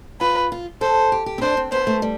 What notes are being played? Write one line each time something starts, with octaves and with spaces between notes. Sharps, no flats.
F4 B4
F4
A4 C5
G4
G4
C4
D4 C5
C4
B3 C5
A3
G3